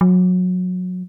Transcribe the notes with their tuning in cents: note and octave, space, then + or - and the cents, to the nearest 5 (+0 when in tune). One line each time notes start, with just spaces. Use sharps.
F#3 -25